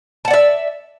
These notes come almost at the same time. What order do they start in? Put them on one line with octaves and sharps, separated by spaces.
A5 F#5 D5 E5